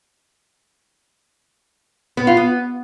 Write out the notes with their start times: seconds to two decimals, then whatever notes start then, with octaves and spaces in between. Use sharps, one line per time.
2.17 B3
2.27 F4
2.37 B3